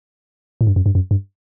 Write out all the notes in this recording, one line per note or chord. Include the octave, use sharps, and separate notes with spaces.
A2
G2
F#2
G2
F#2
G2